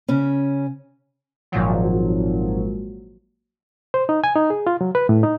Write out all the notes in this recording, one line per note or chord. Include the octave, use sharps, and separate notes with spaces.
C#3 C#4
G#1 A#2 F3 F#3
C5
D#4
G#5
D#4
G#4
F4
F#3
B4
A2
D#4